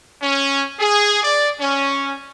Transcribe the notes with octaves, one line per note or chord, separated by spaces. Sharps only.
C#4
G#4
D5
C#4